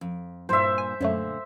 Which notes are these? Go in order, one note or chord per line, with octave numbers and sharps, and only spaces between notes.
F2
G2 A#2 E4 C5 E5
G#5
F#2 A#2 D3 F#3 A3